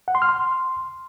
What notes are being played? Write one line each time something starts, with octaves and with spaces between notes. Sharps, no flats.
F#5
C6
F6
C6